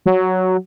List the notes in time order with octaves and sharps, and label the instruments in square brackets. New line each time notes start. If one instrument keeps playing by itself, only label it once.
[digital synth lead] F#3